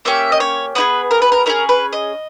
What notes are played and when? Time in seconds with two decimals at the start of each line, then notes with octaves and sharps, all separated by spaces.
0.05 A#3 C#4 G4 E5
0.32 D#5
0.40 C#5
0.75 B3 E4 G#4 B4
1.11 A#4
1.22 B4
1.32 A#4
1.46 C#4 E4 G#4 A#4
1.69 B4
1.93 D#5